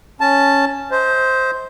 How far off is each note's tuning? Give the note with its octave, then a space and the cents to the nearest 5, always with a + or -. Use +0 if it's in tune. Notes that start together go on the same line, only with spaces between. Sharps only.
C#4 +0 A5 +0
C5 +0 D#5 +40